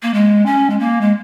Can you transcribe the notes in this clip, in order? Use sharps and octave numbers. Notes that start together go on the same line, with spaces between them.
A#3
G#3
C#4
G#3
A#3
G#3